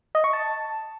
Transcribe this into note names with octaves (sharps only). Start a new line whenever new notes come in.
D#5
C#6
A5